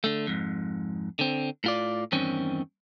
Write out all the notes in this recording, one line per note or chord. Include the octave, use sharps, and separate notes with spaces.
D3 A3
F2 G#2
D3 C4
A2 F4 D5
E2 G2 D#3 C4 C#4